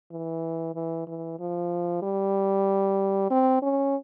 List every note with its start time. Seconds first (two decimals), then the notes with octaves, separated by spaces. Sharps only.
0.12 E3
0.75 E3
1.07 E3
1.39 F3
2.02 G3
3.31 C4
3.62 C#4